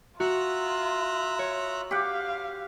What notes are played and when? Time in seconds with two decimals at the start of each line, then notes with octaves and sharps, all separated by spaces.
0.20 F4 F#4 E5 A#5 F#6
1.39 C#5
1.91 G4 F5 F#5